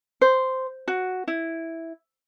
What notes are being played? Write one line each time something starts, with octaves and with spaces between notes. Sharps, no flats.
C5
F#4
E4